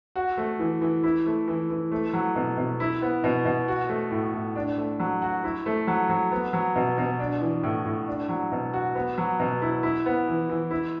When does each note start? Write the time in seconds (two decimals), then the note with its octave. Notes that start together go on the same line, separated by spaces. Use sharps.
0.16 F#4
0.37 A3
0.59 E3
0.81 E3
1.03 E4
1.26 A3
1.48 E3
1.70 E3
1.92 A3
2.13 F#3
2.36 B2
2.58 B2
2.80 E4
3.02 B3
3.24 B2
3.45 B2
3.68 F#4
3.89 A3
4.11 A2
4.34 A2
4.55 D4
4.77 A3
5.00 F#3
5.22 F#4
5.44 E4
5.66 A3
5.87 F#3
6.09 F#3
6.31 B3
6.53 F#3
6.76 B2
6.98 B2
7.19 D4
7.41 E3
7.63 A2
7.86 A2
8.08 D4
8.29 F#3
8.52 B2
8.73 F#4
8.95 B3
9.18 F#3
9.40 B2
9.62 E4
9.83 E4
10.06 B3
10.28 E3
10.49 E3
10.71 E4